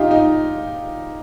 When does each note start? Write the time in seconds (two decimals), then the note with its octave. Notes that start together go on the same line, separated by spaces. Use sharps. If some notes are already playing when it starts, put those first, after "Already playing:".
Already playing: D#4 F4 G4
0.11 D#4